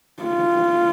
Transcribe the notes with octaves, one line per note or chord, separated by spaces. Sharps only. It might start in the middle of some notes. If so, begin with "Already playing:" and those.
F4